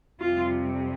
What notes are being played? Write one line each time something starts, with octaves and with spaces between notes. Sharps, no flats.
F2 C3 G3 F4